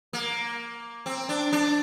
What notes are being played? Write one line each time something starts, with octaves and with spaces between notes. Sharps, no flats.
A#3
C4
D4
D4